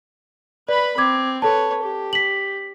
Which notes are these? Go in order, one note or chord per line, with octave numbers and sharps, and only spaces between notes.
B4 D5 B5
C4 D6 G#6
A4 B4 C#5 A5
G4
B6 F#7